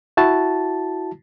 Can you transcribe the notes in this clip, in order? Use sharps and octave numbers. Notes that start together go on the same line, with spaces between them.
E4 F#4 A5